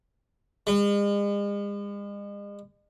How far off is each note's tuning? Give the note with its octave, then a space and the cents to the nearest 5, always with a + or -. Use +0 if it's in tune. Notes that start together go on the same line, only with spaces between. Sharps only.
G#3 -40